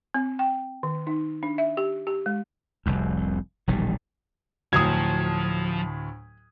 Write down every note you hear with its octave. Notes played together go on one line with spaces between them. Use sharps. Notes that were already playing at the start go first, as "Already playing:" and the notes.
C4
G5
D#3
D#4
D4
E5
G4
G4
G#3
F1 C2 F2
E1 A#1 D#3 G3
D2 A2 F3 F#3 D#6 G#6